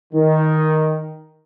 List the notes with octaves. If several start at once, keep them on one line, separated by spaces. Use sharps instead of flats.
D#3